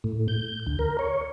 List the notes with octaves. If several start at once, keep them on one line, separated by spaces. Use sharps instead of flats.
A2
G6
D2
A#4
C#5